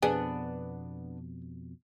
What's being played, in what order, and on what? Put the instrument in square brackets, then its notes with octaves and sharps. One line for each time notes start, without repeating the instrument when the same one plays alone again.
[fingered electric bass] F2 B2 [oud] B3 D4 [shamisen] G#4